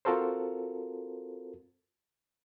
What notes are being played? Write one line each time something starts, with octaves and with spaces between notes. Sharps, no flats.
C4 F4 F#4 A4 A#4 C5